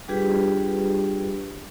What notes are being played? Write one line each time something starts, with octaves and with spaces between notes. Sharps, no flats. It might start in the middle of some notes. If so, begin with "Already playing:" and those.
G3 D4 F4 G4 G#4 B4